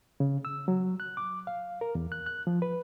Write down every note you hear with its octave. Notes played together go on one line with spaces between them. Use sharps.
C#3
E6
F#3
F#6
D6
F5
A#4
E2
F#6
F#6
F3
B4